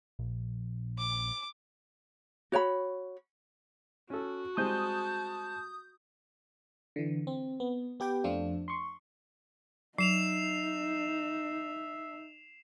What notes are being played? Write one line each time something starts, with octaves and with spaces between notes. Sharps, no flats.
A#1
D6
F#4 C#5 G5 B5
C#4 F#4 A4
G3 G#3 C4 A5 D#6 G6
D3 E3
C4
B3
B3 G4 B4 G5
F2 F3 A3 D4 F4
C6 C#6
F#3 D#4 E5 C7 E7 F7